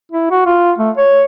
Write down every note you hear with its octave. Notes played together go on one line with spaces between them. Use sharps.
E4
F#4
F4
A3
C#5